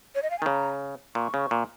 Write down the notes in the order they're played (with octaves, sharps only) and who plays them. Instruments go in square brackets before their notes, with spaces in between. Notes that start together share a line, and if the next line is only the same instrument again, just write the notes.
[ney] C#5
D#5
F5
G#5
[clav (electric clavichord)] D#3
[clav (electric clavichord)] C#3 [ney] A#5
[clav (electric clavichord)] A#2 [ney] C#6
[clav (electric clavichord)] C#3
A#2